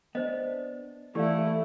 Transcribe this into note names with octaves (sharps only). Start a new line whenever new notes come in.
B3 D4 C5 D#5
E3 A3 E4 G4 D5 F5